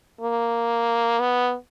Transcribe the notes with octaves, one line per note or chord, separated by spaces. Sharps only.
A#3
B3